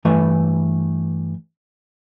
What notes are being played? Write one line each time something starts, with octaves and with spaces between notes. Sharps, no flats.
G2 E3 A3 B4 E5